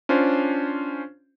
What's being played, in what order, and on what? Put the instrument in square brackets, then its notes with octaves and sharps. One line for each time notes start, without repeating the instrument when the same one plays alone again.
[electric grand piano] C#4 D4 F4 C5